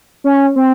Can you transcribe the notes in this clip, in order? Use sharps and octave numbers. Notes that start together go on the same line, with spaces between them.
C#4
C4